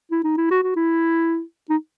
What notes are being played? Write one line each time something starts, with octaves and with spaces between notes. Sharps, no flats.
E4
D#4
E4
F#4
F#4
E4
D#4